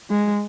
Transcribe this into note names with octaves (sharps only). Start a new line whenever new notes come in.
G#3